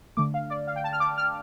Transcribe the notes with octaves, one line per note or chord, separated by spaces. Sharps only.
D3 A3 D6
F5
D5
F5
G5
A5
F6
D6
F6